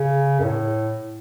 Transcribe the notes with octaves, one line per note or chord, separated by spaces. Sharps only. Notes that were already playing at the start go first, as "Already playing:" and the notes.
Already playing: C#3
F#2
A2